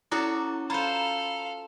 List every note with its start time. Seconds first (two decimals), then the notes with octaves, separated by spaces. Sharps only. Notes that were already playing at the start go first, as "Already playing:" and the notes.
0.11 C#4 E4 F#4 A4 A#5 D6
0.70 F4 A4 C5 F5 A#5 B5